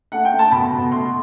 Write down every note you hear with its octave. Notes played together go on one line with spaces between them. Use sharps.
A3 F#5
G5
A3
A5
B2 B5
B2
A3 C6